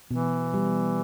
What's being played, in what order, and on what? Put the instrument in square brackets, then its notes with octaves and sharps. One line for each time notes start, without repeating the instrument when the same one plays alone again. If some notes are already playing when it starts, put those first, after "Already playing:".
[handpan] B2 [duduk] E3
[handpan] G3